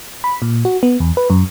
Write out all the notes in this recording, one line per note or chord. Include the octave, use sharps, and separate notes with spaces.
B5
A#2
F#4
B3
E2
B4
F#2